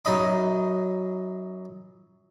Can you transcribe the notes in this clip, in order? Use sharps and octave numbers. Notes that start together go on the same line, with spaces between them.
F#2 D#4 D#5 B5